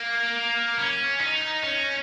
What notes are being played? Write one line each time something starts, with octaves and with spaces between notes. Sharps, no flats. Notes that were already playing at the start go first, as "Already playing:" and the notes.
Already playing: A#3
C#4
D#4
C#4